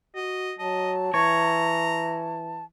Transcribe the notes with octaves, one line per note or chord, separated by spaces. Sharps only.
F#4 D#5
F#3 D#5 A5
E3 C#5 A#5